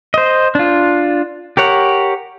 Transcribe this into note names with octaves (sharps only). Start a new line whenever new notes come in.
C5 D#5
D4 F4
G4 A#4 C#5 F#5